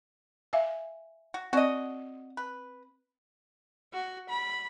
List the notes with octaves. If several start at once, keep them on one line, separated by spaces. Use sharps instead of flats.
E5 F5 G#5
F#4
C4 F#4 D5 D#5
B4
F#4
B5